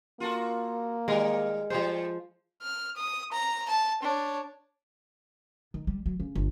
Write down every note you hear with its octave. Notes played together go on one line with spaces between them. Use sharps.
A#3 F4 F#4 A4
D#3 G3 G#3 A#4
F3 G3 A3 C5
F6
D#6
A#5
A5
D4 C#5
D#3
G3
F#3
C#3
G1